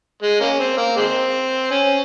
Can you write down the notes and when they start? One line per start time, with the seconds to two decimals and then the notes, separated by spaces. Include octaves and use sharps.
0.22 G#3
0.41 A#3 C#4
0.60 C4
0.77 A#3
0.97 G#3 C4
1.71 C#4